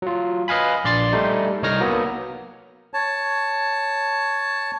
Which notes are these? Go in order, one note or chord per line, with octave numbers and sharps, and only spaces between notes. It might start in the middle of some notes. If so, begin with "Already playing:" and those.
F#3 F4
B4 D#5 F5 G#5 B5
A#1 D5 C6 A6 C7
G3 A3 D#4
C2 D#4 C#5 F6 A#6
F#3 A#3 B3
C#5 A5